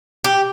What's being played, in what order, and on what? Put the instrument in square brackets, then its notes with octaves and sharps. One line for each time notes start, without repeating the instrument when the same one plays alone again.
[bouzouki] G4